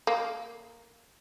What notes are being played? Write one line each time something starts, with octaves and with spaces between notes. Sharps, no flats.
A#3